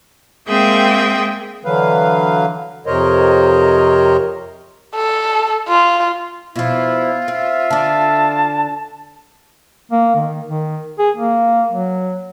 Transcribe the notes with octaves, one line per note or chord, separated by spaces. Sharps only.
G#3 A#3 C4 G#4 E5 G5
D3 E3 F#3 B4 F5
F2 C3 A#4 C5 C#5 D#5
A4
F4
B2 F3 E4 F4
C4 E5
D3 D4 A5
A#3
D#3
D#3
G#4
A#3
F#3